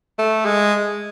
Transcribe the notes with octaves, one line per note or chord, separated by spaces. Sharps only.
A3
G#3